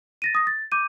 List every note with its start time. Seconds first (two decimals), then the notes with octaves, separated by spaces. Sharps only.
0.22 A6 A#6 D#7
0.35 D#6 A#6
0.47 A6
0.72 D6 G6 D#7